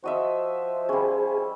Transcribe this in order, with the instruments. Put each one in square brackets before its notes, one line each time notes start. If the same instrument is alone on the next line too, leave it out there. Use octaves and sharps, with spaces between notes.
[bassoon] F3 [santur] F#4 D#5 E5
[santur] G3 C#4 [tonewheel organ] G#4